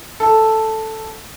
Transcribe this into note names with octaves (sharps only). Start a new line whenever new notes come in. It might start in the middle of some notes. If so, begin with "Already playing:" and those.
A4